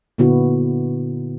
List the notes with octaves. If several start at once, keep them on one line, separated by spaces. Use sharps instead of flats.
A#2 D3 B3 E4 F#4